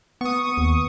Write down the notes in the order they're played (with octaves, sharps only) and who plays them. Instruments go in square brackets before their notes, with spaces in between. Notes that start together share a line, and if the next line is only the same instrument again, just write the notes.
[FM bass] B3 [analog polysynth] C#6 D#6
[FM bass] D#2